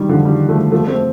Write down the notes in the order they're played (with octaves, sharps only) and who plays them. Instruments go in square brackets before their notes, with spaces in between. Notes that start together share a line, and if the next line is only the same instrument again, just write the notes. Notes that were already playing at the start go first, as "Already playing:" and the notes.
Already playing: [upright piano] D#3 G3
D3 F3
D#3 G3
F3 A3
F3 A3
A3 C4